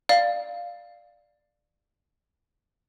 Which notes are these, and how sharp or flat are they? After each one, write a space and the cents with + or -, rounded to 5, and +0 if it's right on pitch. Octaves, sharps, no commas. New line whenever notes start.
D5 +10 F5 +0